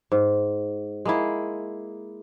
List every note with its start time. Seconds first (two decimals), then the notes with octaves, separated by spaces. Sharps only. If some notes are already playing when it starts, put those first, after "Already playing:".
0.12 G#2
1.05 G#3 A#3 E4